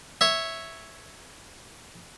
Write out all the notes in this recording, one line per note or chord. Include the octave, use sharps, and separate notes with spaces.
C#5 E5